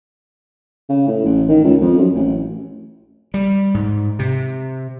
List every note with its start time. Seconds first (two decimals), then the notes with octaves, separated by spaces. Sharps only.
0.89 C#3
1.07 A2
1.25 A1
1.49 D#3
1.64 C#2
1.81 F2
1.98 F#2
2.15 A1
3.34 G3
3.74 G#2
4.19 C3